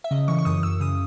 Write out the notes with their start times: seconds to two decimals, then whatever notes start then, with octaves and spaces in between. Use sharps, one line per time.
0.04 E5
0.11 C#3 D#5
0.28 E3 C#6
0.39 C#6
0.45 F#2 D#6
0.63 F#2 E6
0.80 C#3 D#6